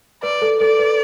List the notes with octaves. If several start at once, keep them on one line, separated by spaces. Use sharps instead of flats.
B4 D5
A4
A4 D5
B4